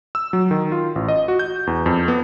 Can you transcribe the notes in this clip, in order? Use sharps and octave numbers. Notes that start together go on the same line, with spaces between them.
E6
F#3
D#3
F4
A1
D#5
F#4
G6
E2
F2
B3